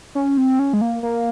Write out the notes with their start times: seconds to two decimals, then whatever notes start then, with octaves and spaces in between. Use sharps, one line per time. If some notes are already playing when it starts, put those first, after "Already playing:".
0.15 C#4
0.37 C4
0.59 C#4
0.73 G#3
0.81 A#3
1.03 A#3